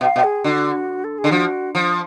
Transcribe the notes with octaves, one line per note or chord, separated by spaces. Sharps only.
B2 F5
B2
G#4
D3 F#4
A4
G#4
D3
F3 F#4
F3